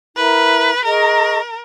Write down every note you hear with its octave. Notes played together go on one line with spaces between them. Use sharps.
E4 A#4 B4 E5 A#5
G#4 A#4 D#5 A#5 C#6